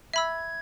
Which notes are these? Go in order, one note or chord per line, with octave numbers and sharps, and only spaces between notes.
E5 B5 E6 G#6